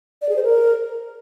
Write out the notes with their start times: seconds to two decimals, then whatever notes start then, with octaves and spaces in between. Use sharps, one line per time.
0.22 D5
0.29 G#4
0.36 C5
0.43 A#4